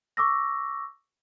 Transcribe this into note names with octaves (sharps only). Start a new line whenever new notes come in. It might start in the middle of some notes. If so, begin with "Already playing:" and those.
C#6 D6 E6 A#6